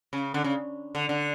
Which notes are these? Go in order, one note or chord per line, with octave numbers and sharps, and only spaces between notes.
C#3
D3
C#3
D3
D3